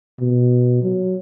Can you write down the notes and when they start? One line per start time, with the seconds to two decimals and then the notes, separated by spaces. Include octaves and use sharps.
0.20 B2
0.83 F#3